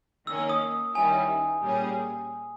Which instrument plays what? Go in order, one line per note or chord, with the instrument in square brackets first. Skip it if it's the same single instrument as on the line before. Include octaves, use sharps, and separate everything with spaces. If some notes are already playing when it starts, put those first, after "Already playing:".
[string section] D#3 A#3 C#4 [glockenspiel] E6
[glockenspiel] D#6
[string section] D#3 G3 C#4 E4 [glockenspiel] G#5
[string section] A#2 G3 C#4 G#4